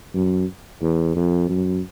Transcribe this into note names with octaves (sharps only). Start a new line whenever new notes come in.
F#2
E2
F2
F#2